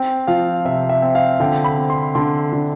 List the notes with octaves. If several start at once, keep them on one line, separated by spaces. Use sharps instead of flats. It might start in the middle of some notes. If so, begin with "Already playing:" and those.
Already playing: C4 G5
F3 F5
C3 E5
E5
C4
F5
D3 G5
B5
C4
C6
D3 C6
D3